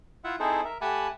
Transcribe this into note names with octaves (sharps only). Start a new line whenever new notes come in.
E4 F4 E5 F#5
C4 D#4 E4 G#4 A4 C5
A#4 E5
A3 G4 F#5 G#5 A5 B5